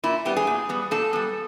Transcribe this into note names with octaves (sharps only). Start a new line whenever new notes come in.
A#2 E4
G3 B3 G4
G#4
A#2
G3 B3
A#2 A4
G3 B3